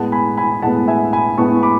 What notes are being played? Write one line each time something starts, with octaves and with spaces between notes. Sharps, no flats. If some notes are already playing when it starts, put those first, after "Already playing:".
Already playing: A2 G#3 B3 F#5 A5
G#5 B5
G#5 B5
A2 G#3 B3 F#5 A5
E5 G#5
G#5 B5
A2 G#3 B3 A5 C#6
B5 D6